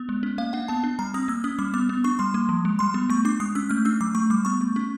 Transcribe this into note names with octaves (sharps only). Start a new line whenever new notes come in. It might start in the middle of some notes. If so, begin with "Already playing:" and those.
Already playing: B3
G#3
C#4
A#3 F5
D4 F#5
B3 A5
D4
G3 A#5
C4 D#6
A#3 E6
C#4 D#6
G3 D6
B3 D6
B3
D4 C#6
G3 C6
A#3
F3
G#3
G3 C6
B3
A3 C#6
D4 D6
G#3 D#6
C#4 E6
A3 F6
D4 E6
F#3 D6
A3 C#6
G3 D6
B3 C#6
A3
C#4